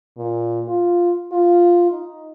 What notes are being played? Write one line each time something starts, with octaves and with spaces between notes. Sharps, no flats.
A#2
F4
F4
D#4